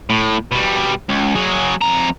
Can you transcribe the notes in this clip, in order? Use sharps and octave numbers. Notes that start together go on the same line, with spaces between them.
A2
B2 G3
C#2
F#3 G#4
F2 A#5